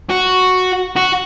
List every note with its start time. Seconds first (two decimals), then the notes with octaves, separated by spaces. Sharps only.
0.10 F#4
0.96 F#4